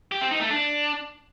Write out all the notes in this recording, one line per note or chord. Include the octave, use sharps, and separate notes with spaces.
G4
C4
D#4
A3
D4